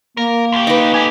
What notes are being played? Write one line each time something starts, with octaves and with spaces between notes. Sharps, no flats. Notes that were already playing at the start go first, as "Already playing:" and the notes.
A#3 A#4
D2 G4
D#4 B4
G4 A4 G#5